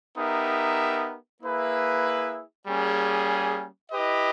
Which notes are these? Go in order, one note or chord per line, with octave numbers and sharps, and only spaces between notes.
B3 D#4 G4 A#4 E5
A#3 E4 G#4 B4 E5
G3 A#3 C#4 G#4
E4 G4 B4 D#5